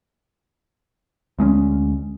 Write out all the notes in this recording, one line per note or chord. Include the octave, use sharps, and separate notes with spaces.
D2 G#3 B3 C#4